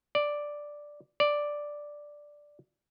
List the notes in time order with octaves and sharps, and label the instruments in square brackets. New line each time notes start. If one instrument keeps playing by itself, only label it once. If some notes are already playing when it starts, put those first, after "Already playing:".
[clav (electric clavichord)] D5
D5